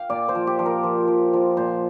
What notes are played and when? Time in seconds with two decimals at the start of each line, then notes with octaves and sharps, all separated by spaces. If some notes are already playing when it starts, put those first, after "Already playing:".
Already playing: F5 G5
0.10 A#2 D5
0.29 C5
0.35 F3
0.47 G4
0.59 F3
0.66 A#4
0.83 F3
1.08 F3
1.33 F3
1.57 A#2 C5